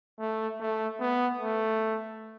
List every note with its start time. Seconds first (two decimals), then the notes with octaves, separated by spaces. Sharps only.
0.19 A3
0.60 A3
1.00 B3
1.41 A3